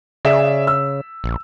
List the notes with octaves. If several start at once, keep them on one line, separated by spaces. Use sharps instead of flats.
C#3 G#4 D5 E5
E6
A#1